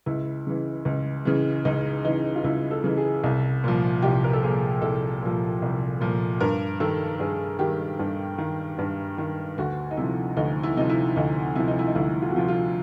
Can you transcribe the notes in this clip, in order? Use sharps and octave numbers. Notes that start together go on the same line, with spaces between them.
C#2 E4
C#3 E3
C#2
C#3 E3
C#2 D#4
C#3 E3 D#4
F4
C#2 E4
A4
C#3 E3
G#4
C2
A#2 F3
C2 G4
A#4
A4
A#2 F3 G#4
C2 A4
A#2 F3
C2
A#2 F3
G2 A#4
D#3 A4
G2 G#4
D#3 G4
G2
D#3
G2
D#3
D2 F#4
D#4
C3 F3 E4
D2 D#4
E4
C3 F3 D#4
E4
D2 D#4
C3 F3 E4
D#4
E4
D#4
D2 E4
F4
F#4
C3 F3 F4
F4